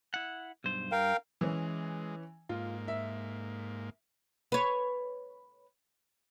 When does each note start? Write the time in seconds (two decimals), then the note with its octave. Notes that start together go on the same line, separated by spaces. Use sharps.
0.14 E4 F#5
0.64 B1 G2 C5
0.92 G2 A#4 F5 G5
1.41 E3 G#3 C#4
2.49 G#2 A#3 F4
2.88 E5
4.52 B4 C#5